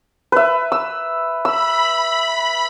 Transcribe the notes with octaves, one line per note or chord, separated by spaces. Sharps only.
B4 E5
E6
B5 E6